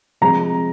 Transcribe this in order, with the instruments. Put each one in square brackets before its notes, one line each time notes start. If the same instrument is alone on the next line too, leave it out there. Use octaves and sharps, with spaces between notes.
[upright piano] C3 F3 G#3 A#5